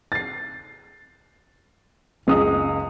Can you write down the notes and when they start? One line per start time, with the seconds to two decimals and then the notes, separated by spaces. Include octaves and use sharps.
0.12 A6 C7
2.27 F#1 C#2 G#4 D#6